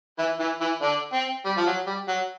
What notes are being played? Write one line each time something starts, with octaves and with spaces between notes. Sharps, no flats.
E3 E4
E3 E4
E3 E4
D3 D4
C4
G3
F3
F#3
G3
F#3